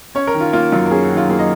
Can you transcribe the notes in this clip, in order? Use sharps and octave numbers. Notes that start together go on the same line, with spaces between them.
C#4 C#5
A#4
D#3
F4
A#3 F4
F#2 F4
A#4
C#4 G#4
F#4
D#3
F4
A#3 G#4
D#5